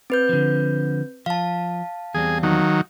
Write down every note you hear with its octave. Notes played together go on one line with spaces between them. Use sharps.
C4 B4 G6
D3 F3
F3 F5 A5
E2 G3 C4 G#4
D#3 F#3